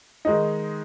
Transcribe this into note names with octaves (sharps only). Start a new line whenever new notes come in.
D#3 G#3 D#4